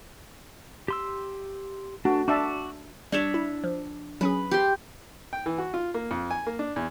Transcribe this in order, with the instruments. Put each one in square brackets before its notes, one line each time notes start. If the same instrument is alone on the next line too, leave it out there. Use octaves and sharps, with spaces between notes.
[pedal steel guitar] G4 C6 E6
[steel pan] A3 F#4 [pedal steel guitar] D4
[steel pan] D4 E5 A5 [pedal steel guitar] F#4 C#6 D6
[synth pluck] G3 [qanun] D4 C#5 E5
[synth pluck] E4
F3
[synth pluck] F#3 C#4 G#4 [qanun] B4
[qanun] G4 C6
[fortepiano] G5
E3
F#4
F4
A#3
F2
G#5
A#3
D4
E2